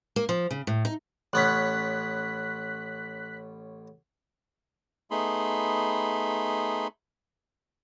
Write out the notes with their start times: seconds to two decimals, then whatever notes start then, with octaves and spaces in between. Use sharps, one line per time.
0.16 A#3
0.29 F3
0.51 C#3
0.67 A2
0.85 D#4
1.33 A1 B3 C#4 F#6 B6
5.11 A3 B3 D#4 G#4 B5 C6